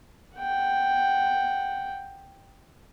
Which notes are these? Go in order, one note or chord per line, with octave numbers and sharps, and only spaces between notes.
F#5 G5